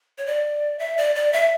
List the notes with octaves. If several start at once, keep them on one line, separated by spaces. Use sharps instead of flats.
C#5
D5
E5
D5
D5
E5